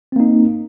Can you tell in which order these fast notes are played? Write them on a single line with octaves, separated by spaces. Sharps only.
C4 A#3 D#4